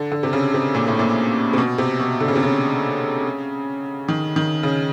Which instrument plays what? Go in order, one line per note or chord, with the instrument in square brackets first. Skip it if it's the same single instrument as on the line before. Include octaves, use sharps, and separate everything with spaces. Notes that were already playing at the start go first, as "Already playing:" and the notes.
Already playing: [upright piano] D3
D3
C3
C#3
C3
A#2
A2
A#2
C3
B2
C3
B2
D3
C#3
C3
C#3
D#3
D#3
C#3